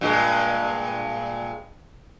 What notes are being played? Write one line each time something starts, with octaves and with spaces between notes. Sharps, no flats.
G2 A#2 G#3